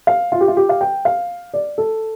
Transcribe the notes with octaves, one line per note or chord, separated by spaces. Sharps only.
F5
F4
G4
F4
G4
F5
G5
F5
D5
A4